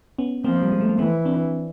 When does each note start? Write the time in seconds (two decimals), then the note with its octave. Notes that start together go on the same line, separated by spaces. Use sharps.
0.18 B3 C#4
0.44 F3 A#3 C4
0.63 G3
0.72 G#3
0.81 A3
0.89 A#3
0.99 E3 A3 B3
1.25 C4 D4